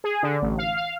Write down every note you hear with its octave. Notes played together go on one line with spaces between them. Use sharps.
G#4
D3
A1
F5
F5